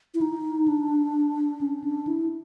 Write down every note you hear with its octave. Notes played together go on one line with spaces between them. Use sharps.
E4
D#4
D4
C#4
D4
E4